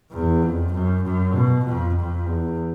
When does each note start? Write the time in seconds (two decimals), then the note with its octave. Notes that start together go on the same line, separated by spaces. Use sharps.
0.12 E2
0.42 F2
0.72 F#2
1.03 F#2
1.34 B2
1.65 F2
1.96 F2
2.26 E2